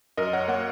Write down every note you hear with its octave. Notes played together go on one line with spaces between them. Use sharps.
F#2 A#4 D#5
C#5 F#5
A#3 C#5 F#5